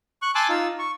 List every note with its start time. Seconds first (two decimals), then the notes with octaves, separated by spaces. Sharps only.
0.22 C#6 F#6
0.35 G#5 A5 C6 D6 E6 F#6
0.49 D#4 F4 E6
0.79 C#6